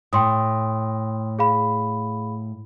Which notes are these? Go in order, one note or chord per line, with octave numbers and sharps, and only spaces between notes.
A2 G5 C6 D#6
G#4 F5 B5